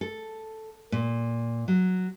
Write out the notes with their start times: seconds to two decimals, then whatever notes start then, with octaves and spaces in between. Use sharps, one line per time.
0.01 A4
0.92 A#2
1.68 F#3